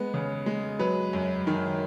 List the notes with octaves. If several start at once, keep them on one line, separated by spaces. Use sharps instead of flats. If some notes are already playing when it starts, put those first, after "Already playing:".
Already playing: G#3 B3
C#3
G#3
F#3 B4
F#2
D#3